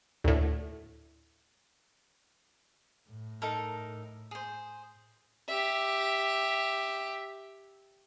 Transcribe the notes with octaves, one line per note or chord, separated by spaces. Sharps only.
D2 A2
A2
D#4 A4 A#4
G#4 C5
G4 E5